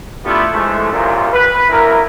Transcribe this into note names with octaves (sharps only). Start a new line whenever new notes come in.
A3 B3 D4 E4 F4 G4
E3 F3 G#3 A3
C2 F#2 A#2
B4
A1 D2 E4 A#4